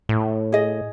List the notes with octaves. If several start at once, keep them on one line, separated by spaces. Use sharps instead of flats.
A2
G#4 D#5